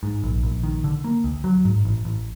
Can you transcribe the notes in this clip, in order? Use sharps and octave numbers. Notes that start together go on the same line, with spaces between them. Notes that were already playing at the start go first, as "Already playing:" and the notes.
G#2
A#1
A#1
D#3
D3
A#3
D2
F#3
G#2
A1
A1